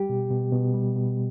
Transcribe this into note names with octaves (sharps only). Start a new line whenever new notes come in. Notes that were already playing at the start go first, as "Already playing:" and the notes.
Already playing: G3 G4
B2
B2
B2
G3
B2